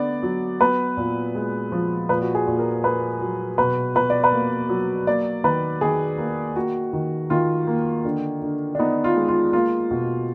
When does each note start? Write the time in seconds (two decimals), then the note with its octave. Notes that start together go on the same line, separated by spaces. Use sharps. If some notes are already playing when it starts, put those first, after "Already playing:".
Already playing: D3 B3 D5
0.23 F#3
0.61 B3 B4
0.97 A#2
1.35 G#3
1.72 F3
2.09 A#2 B4
2.22 F#4
2.35 G#4
2.47 A#2
2.59 A#4
2.84 A#3 B4
3.21 F#3
3.58 B2 B4
3.95 B2 B4
4.10 D5
4.24 B4
4.32 A#3
4.69 F#3
5.07 A#3 D5
5.44 D#3 B4
5.81 D#3 G#4
6.18 A#3
6.55 A#3 F#4
6.93 D#3
7.30 D#3 F4
7.67 A#3
8.05 D3
8.42 D3
8.75 D4
8.79 B3 D#4
9.04 F4
9.16 G#3
9.29 F4
9.53 A#3 F4
9.91 B2